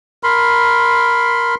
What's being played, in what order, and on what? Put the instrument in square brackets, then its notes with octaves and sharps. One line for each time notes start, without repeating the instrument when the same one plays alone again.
[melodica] A#4 B5 C6